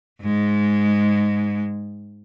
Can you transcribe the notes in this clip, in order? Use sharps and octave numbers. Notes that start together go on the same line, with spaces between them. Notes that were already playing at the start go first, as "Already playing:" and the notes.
G#2 G#3